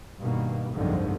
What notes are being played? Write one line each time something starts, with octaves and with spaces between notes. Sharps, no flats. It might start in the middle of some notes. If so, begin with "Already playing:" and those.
G2 B2 D#3 A#3
F#1 C2 G#2 D3 D#3 F3